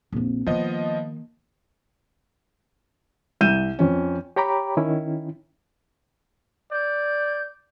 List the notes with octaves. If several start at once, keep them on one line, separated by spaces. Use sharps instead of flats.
A#1 F2
D#3 F3 A#3 B3 D#5
C2 G6 D#7 E7
F2 C#4
G4 C#5 G5 A#5 B5 D6
D#3 C#4 E4
D5 G6